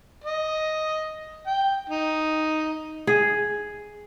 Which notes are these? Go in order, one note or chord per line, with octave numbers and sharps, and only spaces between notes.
D#5
G5
D#4
G#4